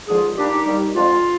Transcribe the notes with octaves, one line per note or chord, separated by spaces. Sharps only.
D#2 D3 F3 G#3 F4 G#4
A#2 G3 D4 D#4 G4
D#2 D#3 G3
F2 D3 G#3 F4